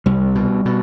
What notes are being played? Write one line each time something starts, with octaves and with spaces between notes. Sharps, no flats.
C2 G3
B2
B2